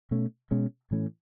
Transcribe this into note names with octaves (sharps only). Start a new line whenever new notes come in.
B2 A3 C#4
B2 G#3 C#4
A2 E3 A3 C#4